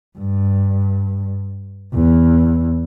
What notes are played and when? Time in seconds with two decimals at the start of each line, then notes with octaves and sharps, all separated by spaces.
0.18 G2
1.94 E2